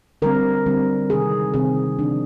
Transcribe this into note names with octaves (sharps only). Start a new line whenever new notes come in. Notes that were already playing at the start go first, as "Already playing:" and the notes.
D3 G3 C4 A#4
D3 G3 C4
C3 D#3 G3 C4 G#4
C3 D#3 G3 C4 G#4
D3 F3 C4 D4